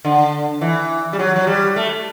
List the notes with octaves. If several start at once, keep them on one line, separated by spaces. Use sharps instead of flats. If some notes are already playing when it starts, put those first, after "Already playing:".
D3
E3
G3
F#3
F#3
G3
A3